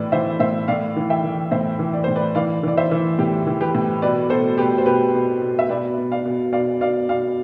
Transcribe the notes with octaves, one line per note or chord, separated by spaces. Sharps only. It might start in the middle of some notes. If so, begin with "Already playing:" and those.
Already playing: A2 E3 B4 D5
E3 C5 E5
A2 C5 E5
A2 D5 F5
E3
E5 G5
E3
A2 C5 E5
E3
D5
A2 C5
B4 D5
E3 D5 F5
E3 D5
C5 E5
E3
A2 G4
E3
G4 B4
A2
B2 B4 D5
B2 A4 C5
B2 G4 B4
C5
B2 G4 B4
B2
B2
E5
B2 B4 D5
B2
D5 F5
B2
B2 D5 F5
B2 D5 F5
B2 D5 F5